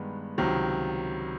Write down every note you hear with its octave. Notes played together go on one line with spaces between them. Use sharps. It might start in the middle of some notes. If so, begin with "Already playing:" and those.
Already playing: G2 D#3 G#3 B3
C#2 C3 D#3 F#3